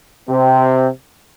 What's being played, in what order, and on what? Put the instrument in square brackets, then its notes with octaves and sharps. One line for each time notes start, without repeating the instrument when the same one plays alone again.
[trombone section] C3 C4